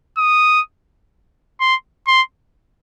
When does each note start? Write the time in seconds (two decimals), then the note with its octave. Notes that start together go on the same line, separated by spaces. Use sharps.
0.18 D#6
1.61 C6
2.08 C6